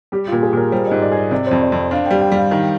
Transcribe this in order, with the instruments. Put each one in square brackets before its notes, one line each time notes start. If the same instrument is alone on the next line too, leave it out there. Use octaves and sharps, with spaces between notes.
[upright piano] G3 [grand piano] G4
[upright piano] A#2 [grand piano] F4
[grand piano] G#4
[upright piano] A#2 [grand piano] A#4
[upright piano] G3 [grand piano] C5
[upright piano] G#2 [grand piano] D#5
[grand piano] D5
[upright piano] G#4
[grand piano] D#5
[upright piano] C3 [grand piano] D5
[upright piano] F2 [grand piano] C5
[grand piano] D5
[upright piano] F2
[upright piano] D4 [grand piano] F5
[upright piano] G3 [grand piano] G5
[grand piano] G5
[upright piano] G3 [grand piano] F5
[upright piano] D#3